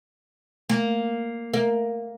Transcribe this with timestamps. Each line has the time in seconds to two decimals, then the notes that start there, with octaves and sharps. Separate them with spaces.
0.69 A#3
1.54 A#3